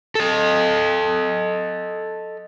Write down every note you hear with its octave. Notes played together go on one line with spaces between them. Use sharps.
A4 D#5